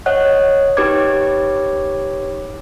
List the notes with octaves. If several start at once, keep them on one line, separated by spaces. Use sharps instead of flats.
C#5 D#5 F#5 F#6
D#4 G4 B4 C#5 D6 G#6